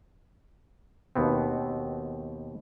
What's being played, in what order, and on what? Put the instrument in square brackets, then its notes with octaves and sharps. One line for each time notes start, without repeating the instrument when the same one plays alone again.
[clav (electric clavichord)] D#2 B2 B3 C4